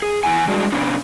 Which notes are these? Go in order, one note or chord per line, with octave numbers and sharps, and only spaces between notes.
G#4
E3 E4 F#5 G#5
G3 G#3 D4 F#4
C3 B3 C#4 D4